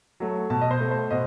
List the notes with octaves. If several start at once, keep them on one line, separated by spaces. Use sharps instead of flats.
F#3 A3
B2 A5
D#5
C5
A3
C5
B2 D#5